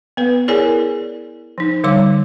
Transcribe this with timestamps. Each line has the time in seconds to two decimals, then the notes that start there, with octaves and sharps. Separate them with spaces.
0.17 B3 B4
0.48 E4 G#4 A#4 C#5 D5 G#5
1.58 F3 D#4
1.84 D3 G3 C#5 D6